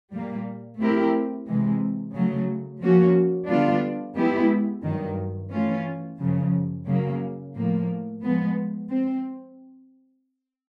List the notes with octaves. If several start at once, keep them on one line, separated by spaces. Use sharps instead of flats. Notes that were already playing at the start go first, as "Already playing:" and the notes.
A#2 G3 A#3
A3 C4 E4 G4 A#4
C3 E3 G#3
C#3 F#3 A3
F3 A#3 C#4 F#4
D3 G3 B3 D4 F4
G#3 B3 E4 G4
G2 D#3 F#3
E3 A3 C#4 F4
F#2 C#3 F3
C#3 F#3 A#3
A2 F3 A#3
F3 G#3 B3
C4